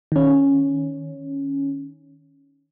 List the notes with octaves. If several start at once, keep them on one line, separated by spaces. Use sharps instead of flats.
D#3 C#4